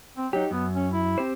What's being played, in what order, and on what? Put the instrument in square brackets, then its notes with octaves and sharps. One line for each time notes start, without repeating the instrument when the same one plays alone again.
[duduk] C4
[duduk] F#3 [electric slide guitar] D#4 G4
[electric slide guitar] F#2 [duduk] B3
[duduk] C#4
E4
[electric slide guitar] C4 G4 C5